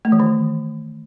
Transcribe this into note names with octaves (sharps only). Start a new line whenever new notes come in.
A3
E3
D#3